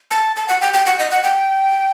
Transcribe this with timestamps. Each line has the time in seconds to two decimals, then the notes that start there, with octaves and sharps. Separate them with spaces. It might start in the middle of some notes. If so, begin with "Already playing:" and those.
0.11 A5
0.36 A5
0.48 F#5
0.61 G5
0.73 G5
0.86 F#5
0.99 D#5
1.11 F#5
1.24 G5